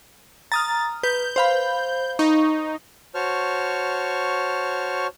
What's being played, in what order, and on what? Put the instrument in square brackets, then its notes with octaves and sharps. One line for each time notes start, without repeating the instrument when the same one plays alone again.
[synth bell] A#5 D#6 F6 [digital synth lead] A6
[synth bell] B4 [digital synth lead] G6
[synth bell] C5 F5 B5
[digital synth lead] D#4 [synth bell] C#6
[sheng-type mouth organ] F#4 C5 C#5 A5 C#6 F6